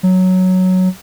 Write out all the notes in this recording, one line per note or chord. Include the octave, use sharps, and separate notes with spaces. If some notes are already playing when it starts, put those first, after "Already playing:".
F#3